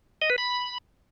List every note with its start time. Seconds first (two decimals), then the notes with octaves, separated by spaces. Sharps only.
0.22 D#5
0.30 B4
0.38 B5